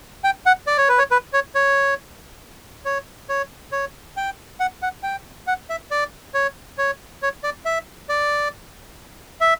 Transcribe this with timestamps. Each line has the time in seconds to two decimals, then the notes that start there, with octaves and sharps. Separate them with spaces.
0.24 G5
0.46 F#5
0.67 D5
0.78 C#5
0.88 B4
0.98 C#5
1.11 B4
1.33 C#5
1.55 C#5
2.85 C#5
3.29 C#5
3.72 C#5
4.17 G5
4.60 F#5
4.82 F#5
5.03 G5
5.47 F#5
5.70 E5
5.91 D5
6.34 C#5
6.78 C#5
7.22 C#5
7.43 D5
7.65 E5
8.09 D5
9.41 E5